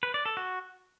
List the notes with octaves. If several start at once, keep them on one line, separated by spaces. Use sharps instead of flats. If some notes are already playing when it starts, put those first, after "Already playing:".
B4
D5
A4
F#4